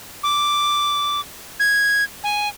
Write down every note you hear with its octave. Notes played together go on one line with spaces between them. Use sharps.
D6
G#6
G#5